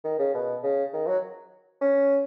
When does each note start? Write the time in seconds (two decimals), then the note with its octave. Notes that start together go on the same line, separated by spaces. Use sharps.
0.04 D#3
0.19 C#3
0.34 B2
0.63 C#3
0.93 D#3
1.07 F#3
1.82 C#4